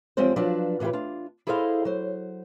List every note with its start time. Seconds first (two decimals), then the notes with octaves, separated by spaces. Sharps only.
0.17 F#2 F3 G3 G#3 C4 C5
0.36 F3 F#3 D4 B4 F5 A5
0.80 A2 E3 F4 G4 B4
0.93 D4 F4
1.47 E4 G#4 A4 C5 D#5 F5
1.85 F#3 C5